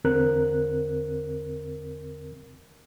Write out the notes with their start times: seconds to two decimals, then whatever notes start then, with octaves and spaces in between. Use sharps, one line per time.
0.04 E2 D3 C4 A#4 F#6